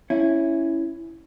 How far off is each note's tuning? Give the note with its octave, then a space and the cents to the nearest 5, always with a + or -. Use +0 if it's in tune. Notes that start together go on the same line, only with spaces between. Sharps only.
C#4 +0 E4 +0